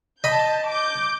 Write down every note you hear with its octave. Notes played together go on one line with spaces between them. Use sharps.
D#5 A5 B5 G6
D6 G6